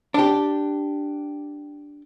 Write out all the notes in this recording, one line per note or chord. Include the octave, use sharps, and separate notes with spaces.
D4 G4